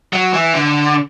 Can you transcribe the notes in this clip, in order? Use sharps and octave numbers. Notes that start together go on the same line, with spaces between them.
F#3
E3
D3